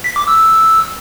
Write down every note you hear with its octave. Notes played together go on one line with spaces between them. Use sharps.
B6
D6
E6